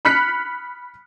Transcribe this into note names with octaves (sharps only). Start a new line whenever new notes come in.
B5 F6 F#6 B6 C#7